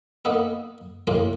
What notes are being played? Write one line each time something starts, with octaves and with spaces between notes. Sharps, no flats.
A#3 B3 D#4 A4
F2 A2 C#3 F3 A#3 F4